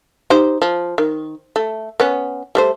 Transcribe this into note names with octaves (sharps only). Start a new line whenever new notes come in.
D#4 G4 C5
F3
D#3
A3
B3 C#4
G3 A3 C5